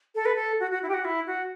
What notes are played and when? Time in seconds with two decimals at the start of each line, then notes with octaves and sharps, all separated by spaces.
0.15 A4
0.25 B4
0.35 A4
0.60 F#4
0.71 F#4
0.83 E4
0.89 G4
0.94 F#4
1.05 E4
1.27 F#4